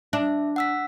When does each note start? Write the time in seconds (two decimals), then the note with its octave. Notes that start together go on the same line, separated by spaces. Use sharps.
0.13 D4 E5
0.56 F#5 E6 B6